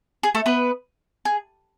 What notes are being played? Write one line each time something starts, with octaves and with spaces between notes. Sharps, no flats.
G#4
A3 A4
B3 B4
G#4